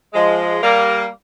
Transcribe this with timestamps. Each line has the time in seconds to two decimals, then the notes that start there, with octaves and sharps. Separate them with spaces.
0.14 F3 G#3
0.62 G3 A#3